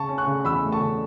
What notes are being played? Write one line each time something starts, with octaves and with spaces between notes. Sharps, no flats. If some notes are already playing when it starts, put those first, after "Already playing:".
Already playing: C#3 A5 C#6
C#4
C#6 F#6
C#3
E2 B5 E6
A3
A5 C#6
C#3